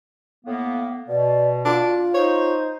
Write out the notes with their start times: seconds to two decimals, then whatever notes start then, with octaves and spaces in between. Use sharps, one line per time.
0.45 A2 A#3 B3
1.09 B2 D5
1.65 D4 F4
2.14 D#4 C5 C#5